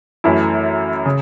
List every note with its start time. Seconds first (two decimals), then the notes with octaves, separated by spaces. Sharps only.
0.24 F#2 E3 A3 E4
1.06 C#3